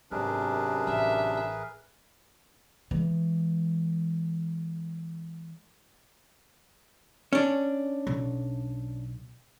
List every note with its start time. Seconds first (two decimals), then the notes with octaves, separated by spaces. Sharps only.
0.11 G#1 F#2 C3 D4 G#4 A#4 B4
0.87 A1 E5
2.91 E3 G#3
7.33 C#4 D4
8.07 B1